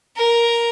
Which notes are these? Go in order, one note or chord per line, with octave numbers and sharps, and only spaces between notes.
A#4